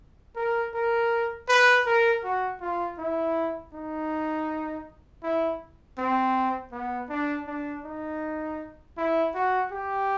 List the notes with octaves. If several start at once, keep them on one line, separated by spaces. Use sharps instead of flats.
A#4
A#4
B4
A#4
F#4
F4
E4
D#4
E4
C4
B3
D4
D4
D#4
E4
F#4
G4